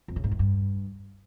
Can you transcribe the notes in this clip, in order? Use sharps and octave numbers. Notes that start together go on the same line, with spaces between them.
F2
C#3
G#2
E2
G2